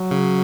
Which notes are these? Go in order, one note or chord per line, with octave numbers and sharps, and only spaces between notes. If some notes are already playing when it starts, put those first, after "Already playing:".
Already playing: F#3
C#3